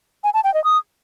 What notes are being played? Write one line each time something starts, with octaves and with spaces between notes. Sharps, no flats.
G#5
A5
G5
D#5
D#6